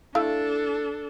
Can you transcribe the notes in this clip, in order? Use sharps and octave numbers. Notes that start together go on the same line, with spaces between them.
A3 D4 E4 A4 F5